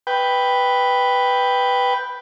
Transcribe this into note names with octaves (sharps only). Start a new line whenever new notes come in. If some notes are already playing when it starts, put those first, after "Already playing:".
B4 G5